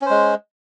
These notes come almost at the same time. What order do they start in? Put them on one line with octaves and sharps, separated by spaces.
C#4 C5 G#3